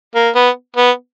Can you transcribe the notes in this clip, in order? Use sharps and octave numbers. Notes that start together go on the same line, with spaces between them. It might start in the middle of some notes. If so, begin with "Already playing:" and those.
A#3
B3
B3